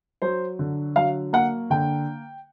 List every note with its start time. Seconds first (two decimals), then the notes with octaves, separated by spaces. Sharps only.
0.22 F#3 C5
0.59 D3
0.96 F#3 F5
1.33 A#3 F#5
1.70 D3 G5